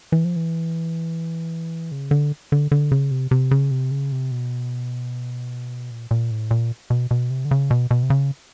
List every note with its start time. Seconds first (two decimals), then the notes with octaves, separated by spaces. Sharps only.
0.12 E3
0.25 F3
0.36 E3
1.92 C#3
2.11 D3
2.52 D3
2.72 D3
2.92 C#3
3.11 C3
3.31 C3
3.51 C#3
3.71 C3
3.91 C#3
4.12 C3
4.31 B2
5.91 A#2
6.11 A#2
6.31 A2
6.51 A#2
6.90 B2
7.11 B2
7.30 C3
7.45 D3
7.51 C#3
7.71 B2
7.91 B2
8.03 C3
8.10 C#3